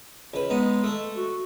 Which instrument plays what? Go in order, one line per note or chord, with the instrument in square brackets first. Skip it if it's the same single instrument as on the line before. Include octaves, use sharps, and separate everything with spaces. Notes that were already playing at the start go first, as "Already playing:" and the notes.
[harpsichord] C#2 B4
[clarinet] G#3 [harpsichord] B3 D#4
[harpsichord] A3 A4
[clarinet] F#4